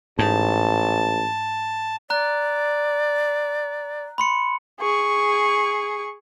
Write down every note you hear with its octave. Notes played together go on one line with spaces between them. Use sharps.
A1 G#2 A5
D5 A#5 F#6
B5 C6 C#7
G#4 C#6